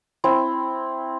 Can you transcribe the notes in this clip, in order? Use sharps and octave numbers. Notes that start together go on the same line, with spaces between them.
C4 E4